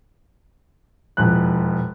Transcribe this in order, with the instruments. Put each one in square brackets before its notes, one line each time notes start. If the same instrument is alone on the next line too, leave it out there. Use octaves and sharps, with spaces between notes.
[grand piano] E1 F2 F#6